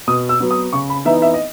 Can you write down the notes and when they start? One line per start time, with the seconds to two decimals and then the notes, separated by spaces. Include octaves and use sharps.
0.08 B2 D#6
0.29 E6
0.40 F#3 B3
0.51 D#6
0.73 C#3 C#6
0.90 B5
1.05 E3 B3 D#4 E5
1.22 E5
1.34 D#5